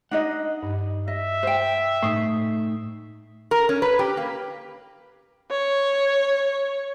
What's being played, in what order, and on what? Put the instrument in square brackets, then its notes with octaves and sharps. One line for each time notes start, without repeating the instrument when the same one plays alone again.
[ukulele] D4 D#4 D#5 [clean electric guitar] F#5
[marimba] G2
[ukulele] D#5 [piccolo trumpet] E5
[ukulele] C5 G5
[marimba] A2 D#6 [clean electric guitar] A3 D#4
[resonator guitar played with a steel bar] A#4
C#4
B4
G4
A#3
[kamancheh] C#5